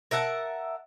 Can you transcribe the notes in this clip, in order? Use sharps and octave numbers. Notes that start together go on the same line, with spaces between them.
A#4 E5 F#5 A5